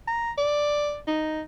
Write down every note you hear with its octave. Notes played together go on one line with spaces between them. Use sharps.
A#5
D5
D#4